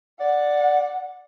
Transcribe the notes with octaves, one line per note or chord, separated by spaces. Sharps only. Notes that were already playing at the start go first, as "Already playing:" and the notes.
D5 F#5